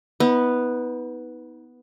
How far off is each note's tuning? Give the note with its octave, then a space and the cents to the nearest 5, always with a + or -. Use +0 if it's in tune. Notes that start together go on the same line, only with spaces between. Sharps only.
B3 +0 D#4 +40